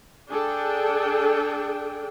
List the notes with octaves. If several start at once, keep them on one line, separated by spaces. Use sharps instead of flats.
D4 G#4 A4 G5